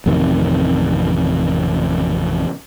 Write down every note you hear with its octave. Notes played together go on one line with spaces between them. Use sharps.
A1 F2 C3 D#3